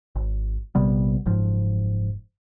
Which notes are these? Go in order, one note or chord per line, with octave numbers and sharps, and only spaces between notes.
G#1
A#1 C3 G3 B3
F#1 G#2 F3